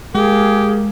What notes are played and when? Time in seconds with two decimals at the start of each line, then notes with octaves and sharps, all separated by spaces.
0.15 G#3 A#3 G4 G#4